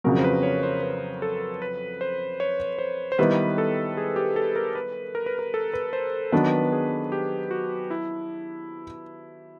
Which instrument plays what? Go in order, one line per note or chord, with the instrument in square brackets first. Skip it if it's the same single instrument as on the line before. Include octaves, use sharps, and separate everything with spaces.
[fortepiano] F2 C#3 F#3 [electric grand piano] A#4
[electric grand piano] C5
B4
C#5
C5
B4
A4
B4
C5
C#5
C5
C5
[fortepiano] D#3 G3 B3 E4 [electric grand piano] B4
[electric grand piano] A4
G#4
G4
A4
A#4
B4
A#4
B4
A#4
A4
B4
C5
[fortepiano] D#3 F#3 B3 D4 [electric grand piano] B4
[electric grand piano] G#4
G4
F#4
E4